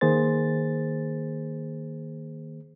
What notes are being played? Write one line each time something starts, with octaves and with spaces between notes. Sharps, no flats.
D#3 A#3 G#4 C5 A6